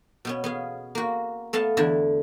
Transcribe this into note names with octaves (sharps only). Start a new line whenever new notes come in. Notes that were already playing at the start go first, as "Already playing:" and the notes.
B2 B3 C#4
B3 G#4 F5
A#3 F#4
A3 B3 F5 A5
E2 D3 E4 E5